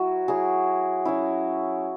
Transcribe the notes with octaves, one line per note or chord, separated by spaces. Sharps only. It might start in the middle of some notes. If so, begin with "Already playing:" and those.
Already playing: F#3 E4 F#4
F#3 E4 G#4
F#3 C#4 E4